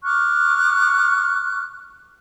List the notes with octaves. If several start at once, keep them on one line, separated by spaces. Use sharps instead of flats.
C#6 D6 F6 F#6